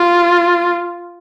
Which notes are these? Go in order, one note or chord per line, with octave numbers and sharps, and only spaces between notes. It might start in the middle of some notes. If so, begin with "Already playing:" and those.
Already playing: F4